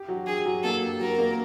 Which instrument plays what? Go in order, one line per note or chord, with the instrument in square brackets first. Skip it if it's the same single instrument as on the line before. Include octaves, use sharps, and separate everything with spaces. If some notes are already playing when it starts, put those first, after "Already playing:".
Already playing: [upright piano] G4
F#3
[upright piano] G4 [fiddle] G#4
[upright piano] F#3
[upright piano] A#3 [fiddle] A4
[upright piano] G4
[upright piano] F#3 [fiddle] A#4
[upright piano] A#3